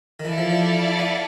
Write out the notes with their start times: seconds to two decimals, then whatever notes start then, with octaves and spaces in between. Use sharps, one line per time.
0.20 D#3
0.25 E3 E4 A4 D5 F5 A5
0.38 F3
0.50 F3
0.99 B3